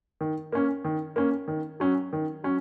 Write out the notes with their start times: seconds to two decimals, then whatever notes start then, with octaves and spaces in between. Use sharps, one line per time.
0.21 D#3
0.52 A#3 C#4
0.85 D#3
1.16 A#3 C#4
1.48 D#3
1.80 F#3 C#4
2.13 D#3
2.44 F#3 C#4